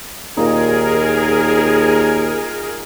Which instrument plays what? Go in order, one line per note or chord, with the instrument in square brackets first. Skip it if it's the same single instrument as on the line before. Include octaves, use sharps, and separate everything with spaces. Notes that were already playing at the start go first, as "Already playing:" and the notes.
[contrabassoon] D#2 [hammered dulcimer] A#2 D#4 [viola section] G#4 A#4